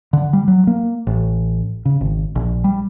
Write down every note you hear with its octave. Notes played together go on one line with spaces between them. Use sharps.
D3
G3
F#3
A#3
A1
C#3
G#1
A#1
G3